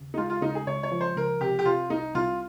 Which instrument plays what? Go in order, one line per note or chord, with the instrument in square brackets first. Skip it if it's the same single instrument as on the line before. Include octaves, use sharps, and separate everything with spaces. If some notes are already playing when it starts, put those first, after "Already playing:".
Already playing: [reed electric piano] D#2 C#3
[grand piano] D#4
[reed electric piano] G#3 [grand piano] F4
[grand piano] F4
[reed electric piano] C#3 [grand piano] D#4
[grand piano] G#4
[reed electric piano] C#2 [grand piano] C#5
[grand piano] C#5
[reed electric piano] F3
[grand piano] C5
[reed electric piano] C#2 [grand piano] A#4
[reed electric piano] C3 [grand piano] G4
[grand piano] G4
[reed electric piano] C3 [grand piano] F4
[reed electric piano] C2 [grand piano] D#4
[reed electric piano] C2 [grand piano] F4